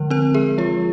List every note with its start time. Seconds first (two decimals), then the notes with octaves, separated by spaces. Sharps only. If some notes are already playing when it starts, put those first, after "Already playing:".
Already playing: D3 F3 G#3 A#4
0.10 C4 A#4
0.34 G#3 G#4
0.58 F3 F4